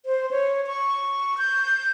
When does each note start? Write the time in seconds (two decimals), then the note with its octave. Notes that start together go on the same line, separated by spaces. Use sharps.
0.06 C5
0.31 C#5
0.66 C#6
1.38 G6